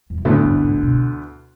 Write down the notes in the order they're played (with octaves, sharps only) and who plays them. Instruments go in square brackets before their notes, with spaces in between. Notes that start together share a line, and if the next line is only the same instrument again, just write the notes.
[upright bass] E2
F#2
[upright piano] D2 D3 B3 E4 [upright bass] A2
[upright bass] F#2
F#2
A2
B2